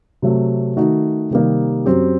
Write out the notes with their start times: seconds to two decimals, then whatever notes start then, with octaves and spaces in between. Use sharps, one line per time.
0.22 C3 F#3 A3
0.77 D#3 A3 D#4 F#4
1.31 C3 D#3 G3 A#3 D#4
1.86 F#2 F#3 C4 G4